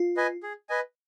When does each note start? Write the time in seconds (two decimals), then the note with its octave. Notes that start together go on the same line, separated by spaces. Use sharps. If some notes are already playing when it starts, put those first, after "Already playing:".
Already playing: F4
0.17 B4 D#5 G#5
0.43 G#4
0.69 B4 D#5 G#5